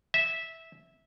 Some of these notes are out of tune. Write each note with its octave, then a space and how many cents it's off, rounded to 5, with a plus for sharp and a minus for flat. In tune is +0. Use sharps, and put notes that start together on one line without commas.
E5 -10